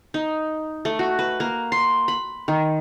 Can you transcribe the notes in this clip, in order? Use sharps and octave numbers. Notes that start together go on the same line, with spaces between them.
D#4
A3
F#4
B4
A#3
C6
B5
D#3